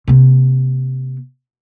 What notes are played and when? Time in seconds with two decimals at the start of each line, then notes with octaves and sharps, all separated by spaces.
0.08 C3 A#3